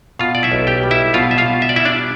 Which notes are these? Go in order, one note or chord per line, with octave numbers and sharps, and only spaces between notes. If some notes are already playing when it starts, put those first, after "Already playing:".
B2 F4 F5
D5
E4 E5
B1
G4 G5
G3
E4 E5
B2 F4 F5
E5
F4 F5
B2
E5
D5
G3 E4 E5
D4 D5